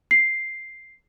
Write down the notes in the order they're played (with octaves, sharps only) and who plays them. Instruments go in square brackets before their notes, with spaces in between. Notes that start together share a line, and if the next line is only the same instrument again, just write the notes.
[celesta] C7